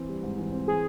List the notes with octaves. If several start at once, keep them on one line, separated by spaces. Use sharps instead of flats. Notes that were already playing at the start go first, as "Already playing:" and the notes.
Already playing: E3 C4
G3
G#2
E3
C4
E3 G#4